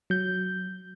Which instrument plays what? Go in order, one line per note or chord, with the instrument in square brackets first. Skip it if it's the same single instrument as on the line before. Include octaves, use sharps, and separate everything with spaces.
[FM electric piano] F#3 G6